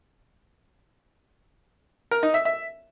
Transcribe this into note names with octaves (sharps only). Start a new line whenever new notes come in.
A#4
D#4
E5
E5